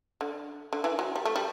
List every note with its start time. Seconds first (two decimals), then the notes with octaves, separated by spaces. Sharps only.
0.21 D3
0.73 D3
0.84 E3
0.99 F#3
1.16 G3
1.25 A3
1.36 G3